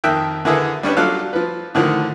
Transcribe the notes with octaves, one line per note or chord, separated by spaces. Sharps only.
F2 D#3 A#3 E5 G5 F#6
D3 A#3 E4 G#4 A4 B4
G3 C#4 D4 B4
F#3 D4 F4 A4 F5 F#6
F3 B4
A2 D3 D#3 F3